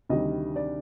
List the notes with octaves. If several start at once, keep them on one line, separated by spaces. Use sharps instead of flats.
D2 C3 D#3 G3 D#5
D5